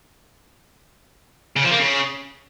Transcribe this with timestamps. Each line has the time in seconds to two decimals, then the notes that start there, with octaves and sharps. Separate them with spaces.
1.56 C#3
1.64 F3
1.72 A#3
1.80 C#3